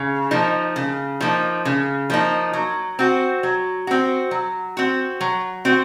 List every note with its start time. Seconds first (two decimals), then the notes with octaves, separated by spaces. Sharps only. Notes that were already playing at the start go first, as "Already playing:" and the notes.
Already playing: C#3
0.31 F3 A#3 D#4
0.76 C#3
1.21 F3 A#3 D#4
1.65 C#3
2.10 F3 A#3 D#4
2.53 F#3
2.99 C4 F#4
3.43 F#3
3.87 C4 F#4
4.31 F#3
4.77 C4 F#4
5.21 F#3
5.65 C4 F#4